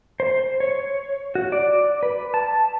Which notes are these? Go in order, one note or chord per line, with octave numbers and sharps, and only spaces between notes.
C5
C#5
F#4
D5
B4
A5